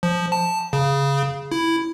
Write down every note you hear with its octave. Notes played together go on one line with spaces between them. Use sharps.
F3
A5
C#3
E4